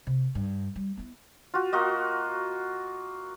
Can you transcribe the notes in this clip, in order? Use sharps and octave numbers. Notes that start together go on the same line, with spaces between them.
C3
G2
G3
B3 E4
F4 F#4
A#3 F4 F#4 D#5